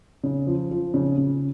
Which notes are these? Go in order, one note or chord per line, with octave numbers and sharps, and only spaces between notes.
C#3
F3
F3
C#3
C#3